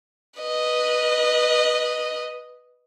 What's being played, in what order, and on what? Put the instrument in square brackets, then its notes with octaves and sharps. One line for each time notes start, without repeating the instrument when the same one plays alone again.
[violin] B4 D#5